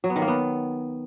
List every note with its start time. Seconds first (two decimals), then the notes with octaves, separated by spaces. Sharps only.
0.04 F#3
0.10 B3
0.16 D#3
0.22 A#3
0.28 B3